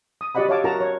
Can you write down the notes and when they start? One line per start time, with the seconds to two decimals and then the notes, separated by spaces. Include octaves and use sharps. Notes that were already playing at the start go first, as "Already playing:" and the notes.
0.21 D#6
0.35 F#4 G4 D5 D#5 F#5 B5
0.49 C#5 E5 F5 A5 D6
0.64 F#4 A#4 A5 A#5
0.80 C#5